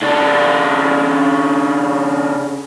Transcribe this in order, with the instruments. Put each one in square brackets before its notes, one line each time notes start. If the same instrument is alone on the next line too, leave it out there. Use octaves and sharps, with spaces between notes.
[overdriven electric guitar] C#3 D4